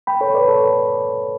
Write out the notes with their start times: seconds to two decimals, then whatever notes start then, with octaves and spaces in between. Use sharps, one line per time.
0.07 G5 B5
0.21 A4 C#5
0.35 B4 D5
0.47 A4 C#5